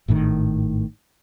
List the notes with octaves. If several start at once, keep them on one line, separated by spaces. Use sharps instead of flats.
G#1 A2 C3 D#3